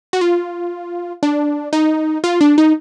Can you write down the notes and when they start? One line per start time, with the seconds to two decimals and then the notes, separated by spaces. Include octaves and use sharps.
0.13 F#4
0.21 F4
1.23 D4
1.73 D#4
2.24 F4
2.41 D4
2.58 D#4